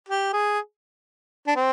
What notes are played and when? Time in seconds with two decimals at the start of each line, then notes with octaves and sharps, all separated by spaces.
0.09 G4
0.33 G#4
1.47 D4
1.56 C4